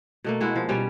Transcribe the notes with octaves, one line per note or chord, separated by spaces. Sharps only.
B2 A3 A#3
G#3 E4 F#4
F3
B2 G3 C#4